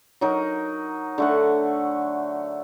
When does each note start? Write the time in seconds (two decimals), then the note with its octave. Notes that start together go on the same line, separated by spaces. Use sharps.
0.21 F#3 D#4 A#4
1.18 D3 A3 F#5